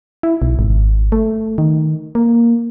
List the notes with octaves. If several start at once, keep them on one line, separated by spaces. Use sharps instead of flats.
E4
B1
G#1
A3
D#3
A#3